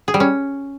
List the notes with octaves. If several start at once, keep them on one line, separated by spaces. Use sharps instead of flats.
G#4
G3
C#4